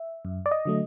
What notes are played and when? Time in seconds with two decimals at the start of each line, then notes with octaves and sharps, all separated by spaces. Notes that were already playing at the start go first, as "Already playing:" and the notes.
Already playing: E5
0.25 F#2
0.46 D5
0.51 D#5
0.65 D3 F#3 A3